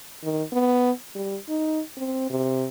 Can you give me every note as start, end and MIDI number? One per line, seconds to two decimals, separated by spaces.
0.24 0.42 51
0.53 0.91 59
1.15 1.37 55
1.49 1.81 63
1.97 2.29 60
2.30 2.68 48